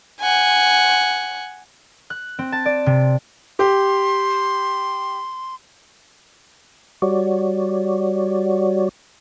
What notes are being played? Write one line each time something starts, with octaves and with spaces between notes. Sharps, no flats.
F#5 G#5
F#6
C4
A5
D5
C3
G4 C6
G3 F#4 C#5 D5